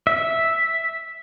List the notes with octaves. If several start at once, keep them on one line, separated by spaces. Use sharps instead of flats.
E5